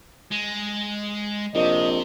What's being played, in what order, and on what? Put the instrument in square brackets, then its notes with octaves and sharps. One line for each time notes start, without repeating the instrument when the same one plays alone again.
[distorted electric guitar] G#3
[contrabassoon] A#1 [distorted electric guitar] C3 [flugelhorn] D#5